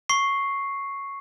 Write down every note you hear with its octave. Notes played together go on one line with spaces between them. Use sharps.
C#6 C7